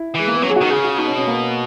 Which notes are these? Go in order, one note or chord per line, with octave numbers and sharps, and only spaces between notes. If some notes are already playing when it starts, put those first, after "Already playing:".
Already playing: E4
E3 G#3
A#3
B3
F#3 C#4
G#4
D#3 F#4
C#3 G#4
F#4
B2 D#4
C#4
C#4
A#3